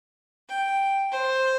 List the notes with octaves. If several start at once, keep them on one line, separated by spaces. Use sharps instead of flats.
G5
C5